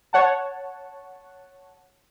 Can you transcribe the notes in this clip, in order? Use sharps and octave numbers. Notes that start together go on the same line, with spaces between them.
C#5 F#5 A5